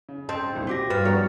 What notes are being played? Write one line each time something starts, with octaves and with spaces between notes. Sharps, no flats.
C#3
C4 C5 D#5 A5
C2 A#2 D#3
F#4 G4 D6 A#6
G2 B4 F6 A6
F3 B3 F#4 A#4 C#5 D5